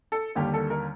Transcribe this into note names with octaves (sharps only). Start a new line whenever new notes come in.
A4
D#2 D3 G3 A#3 G4
A4
A#4